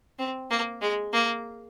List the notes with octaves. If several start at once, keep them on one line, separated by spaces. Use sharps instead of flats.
C4
A#3
G#3
A#3